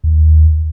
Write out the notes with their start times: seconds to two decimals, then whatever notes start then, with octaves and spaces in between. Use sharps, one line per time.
0.04 D#2